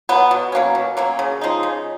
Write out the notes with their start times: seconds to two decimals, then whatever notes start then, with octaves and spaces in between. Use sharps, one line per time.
0.09 F#3 B3
0.31 B2
0.52 F#3 A#3 C#4
0.75 B2
0.97 F#3 A#3 C#4
1.19 C#3
1.41 F3 G#3 D#4
1.63 C#3